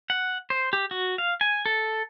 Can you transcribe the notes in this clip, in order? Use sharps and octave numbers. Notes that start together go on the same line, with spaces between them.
F#5
C5
G4
F#4
F5
G#5
A4